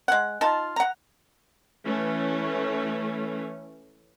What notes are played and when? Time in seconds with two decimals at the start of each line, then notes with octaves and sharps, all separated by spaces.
0.08 G#3 F#5
0.41 D#4 F4 A5
0.76 F#5 A#5
1.84 E3 A3 C#4